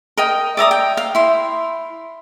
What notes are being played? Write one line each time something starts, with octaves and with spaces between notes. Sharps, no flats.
A#4 D#5 G5
D5 E5 A#5 D#6
G5
F5
E4 C6